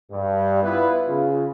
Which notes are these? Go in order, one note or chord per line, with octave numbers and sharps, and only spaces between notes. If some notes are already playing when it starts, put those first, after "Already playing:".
G2
B3 E4 F4 B4
C#3 F4